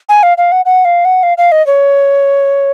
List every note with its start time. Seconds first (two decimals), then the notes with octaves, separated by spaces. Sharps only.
0.09 G#5
0.23 F5
0.37 F5
0.52 F#5
0.65 F#5
0.85 F5
1.05 F#5
1.23 F5
1.38 F5
1.52 D#5
1.67 C#5